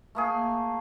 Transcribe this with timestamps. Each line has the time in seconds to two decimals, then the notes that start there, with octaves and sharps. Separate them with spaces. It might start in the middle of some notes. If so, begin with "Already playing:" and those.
0.15 A3 A#3 G#4